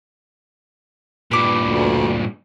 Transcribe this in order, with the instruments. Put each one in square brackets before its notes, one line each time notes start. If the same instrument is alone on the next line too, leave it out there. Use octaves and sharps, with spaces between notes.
[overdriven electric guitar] G2 A#2 [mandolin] B4 D6
[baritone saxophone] D2